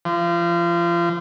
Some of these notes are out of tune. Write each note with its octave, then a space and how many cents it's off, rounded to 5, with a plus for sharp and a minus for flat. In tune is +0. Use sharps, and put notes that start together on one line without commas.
F3 -30